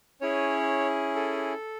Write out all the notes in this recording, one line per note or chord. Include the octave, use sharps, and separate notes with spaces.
C#4 E4 G#4 C#5
A4